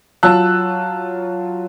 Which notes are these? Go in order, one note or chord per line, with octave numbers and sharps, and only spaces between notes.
F#3 F4 A5 E6 F#6